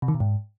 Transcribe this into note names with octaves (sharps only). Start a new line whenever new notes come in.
C3
D#3
B2
G#2